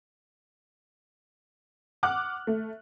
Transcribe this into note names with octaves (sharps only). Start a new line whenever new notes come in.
F#5 D6 F6 F#6
A3